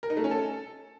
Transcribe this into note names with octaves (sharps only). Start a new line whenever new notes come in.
A#4
D#4
A3
C#4
A4